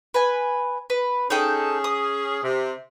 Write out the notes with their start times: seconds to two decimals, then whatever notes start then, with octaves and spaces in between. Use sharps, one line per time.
0.14 B4 G#5
0.90 B4
1.30 C#4 D#4 G#4 A4 G5
1.84 D#6
2.44 C3